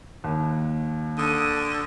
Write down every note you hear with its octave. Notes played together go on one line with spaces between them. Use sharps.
D#2
D3 D#6